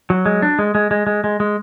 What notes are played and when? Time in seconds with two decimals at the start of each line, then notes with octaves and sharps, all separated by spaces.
0.10 F#3
0.26 G#3
0.42 D4
0.59 G#3
0.75 G#3
0.91 G#3
1.07 G#3
1.24 G#3
1.40 G#3